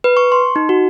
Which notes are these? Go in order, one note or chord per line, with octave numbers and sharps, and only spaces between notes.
B4
C#6
C6
D#4
F#4